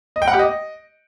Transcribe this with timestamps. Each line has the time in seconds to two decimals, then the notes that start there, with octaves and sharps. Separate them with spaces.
0.16 D#5
0.22 G5
0.28 F#5
0.33 G4
0.39 D#5